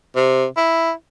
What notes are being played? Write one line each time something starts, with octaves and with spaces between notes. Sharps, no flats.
C3
E4